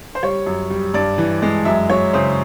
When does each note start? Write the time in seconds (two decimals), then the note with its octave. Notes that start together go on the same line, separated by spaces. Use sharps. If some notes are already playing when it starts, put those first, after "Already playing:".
0.15 C5
0.23 G3 C#5
0.46 F#2
0.70 G3
0.94 G2 D5
1.18 E3
1.42 G#3
1.65 F#2 E5
1.90 F#3 C#5
2.13 C#3 C5